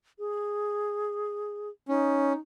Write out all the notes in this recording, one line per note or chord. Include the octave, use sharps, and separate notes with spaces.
G#4
C#4 D#4